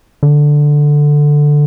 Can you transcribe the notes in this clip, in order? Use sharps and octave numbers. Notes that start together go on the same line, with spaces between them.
D3